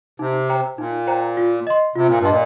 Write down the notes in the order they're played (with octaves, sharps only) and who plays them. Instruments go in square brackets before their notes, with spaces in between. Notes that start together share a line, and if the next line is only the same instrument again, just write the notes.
[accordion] C3 [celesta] D#4
[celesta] C5 G5 A#5
[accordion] A#2 [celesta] D#4
[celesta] C5 G5 A#5
F4
D#5 C6
[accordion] C3 [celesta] F4
[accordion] A#2
G2
[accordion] A#2 [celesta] D#5 C6